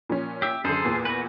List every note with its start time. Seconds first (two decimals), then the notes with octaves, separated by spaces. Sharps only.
0.09 A#2 F3 C#4
0.42 G4 E5
0.64 F#2 D3 G#4 A4 C5
0.85 E2 A#2
1.05 F#4 B4